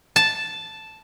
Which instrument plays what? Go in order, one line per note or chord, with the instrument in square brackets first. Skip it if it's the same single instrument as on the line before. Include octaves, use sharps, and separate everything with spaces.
[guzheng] A5